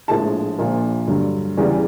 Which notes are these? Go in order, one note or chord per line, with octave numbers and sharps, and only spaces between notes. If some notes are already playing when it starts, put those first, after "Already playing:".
A#1 A2 F3 G#3 A5
A#1 A#2 F3
G2 D3 F#3
E2 C#3 E3 G3